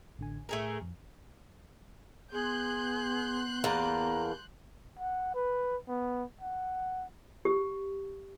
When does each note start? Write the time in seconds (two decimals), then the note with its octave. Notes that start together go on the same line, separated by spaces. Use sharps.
0.19 A1 D3 G#5
0.49 A2 A3 G#4 A#4 G#5 A#5
0.81 F2
2.32 B3 G#4 C6 F#6 G6
3.64 E2 A#3 A5 A#5
4.99 F#5
5.34 B4
5.88 B3
6.41 F#5
7.45 G4